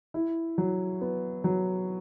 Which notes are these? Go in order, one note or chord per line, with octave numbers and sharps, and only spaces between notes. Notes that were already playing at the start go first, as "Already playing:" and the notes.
E4
F#3
B3
F#3